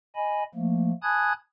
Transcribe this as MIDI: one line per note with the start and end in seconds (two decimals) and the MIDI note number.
0.15 0.43 75
0.15 0.43 80
0.15 0.43 83
0.54 0.92 53
0.54 0.92 57
0.54 0.92 58
1.03 1.33 80
1.03 1.33 81
1.03 1.33 83
1.03 1.33 87
1.03 1.33 90
1.03 1.33 92